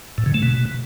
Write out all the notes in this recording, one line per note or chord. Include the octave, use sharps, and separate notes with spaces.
A2
C#3
A3
B2